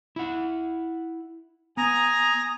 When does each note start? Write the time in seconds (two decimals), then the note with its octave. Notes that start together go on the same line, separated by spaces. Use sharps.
0.16 E4 F#5
1.77 B3 G#5 A#5 D#6